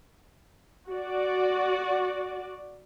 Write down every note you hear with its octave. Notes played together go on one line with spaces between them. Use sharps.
F#4 D5